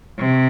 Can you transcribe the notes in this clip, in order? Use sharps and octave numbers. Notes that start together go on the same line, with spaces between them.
C3